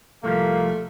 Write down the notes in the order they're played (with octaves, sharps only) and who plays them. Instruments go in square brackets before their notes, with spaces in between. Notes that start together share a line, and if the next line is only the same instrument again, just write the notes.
[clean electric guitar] C2 F3 G3 [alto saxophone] A3 [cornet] A#3